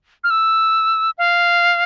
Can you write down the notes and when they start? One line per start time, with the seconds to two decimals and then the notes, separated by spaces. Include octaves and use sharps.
0.24 F6
0.30 E6
1.18 F5